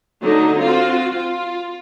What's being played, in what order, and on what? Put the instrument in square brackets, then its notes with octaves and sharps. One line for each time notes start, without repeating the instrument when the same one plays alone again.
[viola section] D3 F#3 A3 D#4
C4 F4 F#4
F4